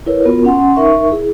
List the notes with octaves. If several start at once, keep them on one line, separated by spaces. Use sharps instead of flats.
E4 A#4 B4 C#5
B3 F4 F#4 A#4
C#4 F#5 G#5 C6
D#4 A#4 E5 C#6
E4 G#4